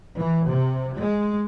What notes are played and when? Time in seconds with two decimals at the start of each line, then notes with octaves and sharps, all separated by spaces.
0.17 E3
0.46 C3
0.98 G#3